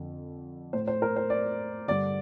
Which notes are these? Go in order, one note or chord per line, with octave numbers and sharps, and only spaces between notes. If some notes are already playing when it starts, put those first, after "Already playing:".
Already playing: F2 D3
A2 C5
C5
A#4
C5
D5
G2 D3 D5